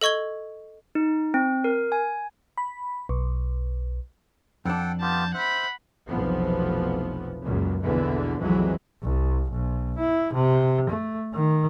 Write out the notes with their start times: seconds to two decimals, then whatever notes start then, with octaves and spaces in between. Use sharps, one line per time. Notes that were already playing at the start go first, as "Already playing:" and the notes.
0.01 A4 D#5 C#6 G#6 G7
0.95 D#4
1.34 C4
1.64 A#4
1.92 G#5
2.58 B5
3.09 B1
4.65 F2 D4 A4 F#5 G5
5.01 B3 F4 G4 A5 G6
5.34 C5 E5 F#5 B5
6.07 F1 B1 E3 F3 B3
7.43 C#2 F#2 A#2
7.82 A#1 E2 B2 D3 E3
8.39 B1 F2 E3 F#3 G#3
9.03 C2
9.51 B1
9.98 E4
10.33 C3
10.90 A3
11.34 D#3